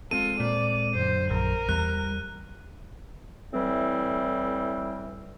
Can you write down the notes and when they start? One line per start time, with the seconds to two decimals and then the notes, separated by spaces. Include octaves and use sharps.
0.11 G#3 C4 F4 A4 D#7
0.40 A#2 D5
0.95 F#2 D3 C5
1.31 A#1 A#4
1.69 E2 G3 F#6
3.53 A2 E3 G3 C4